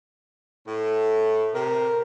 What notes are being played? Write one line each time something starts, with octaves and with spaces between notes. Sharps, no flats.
A2
C3 A#4